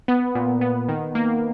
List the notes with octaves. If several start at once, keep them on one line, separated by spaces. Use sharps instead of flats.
B3
A#2
B3
D#3
A#3